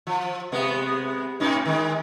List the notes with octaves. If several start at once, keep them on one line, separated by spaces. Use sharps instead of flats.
F3
C3 G#3 B3
A2 C#4 D#4
D#3 G#3